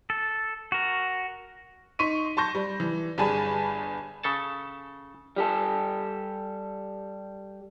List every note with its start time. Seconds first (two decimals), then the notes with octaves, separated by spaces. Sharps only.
0.10 A4
0.72 F#4 A#4
1.99 D#4 C6 C#6 B6 D#7
2.37 A5 C6 C#6 G6 A#6
2.55 G3
2.80 E3
3.18 G1 G3 G#4 G#5 A5 B5
4.23 C#3 A4 A5
5.36 G3 G4 A4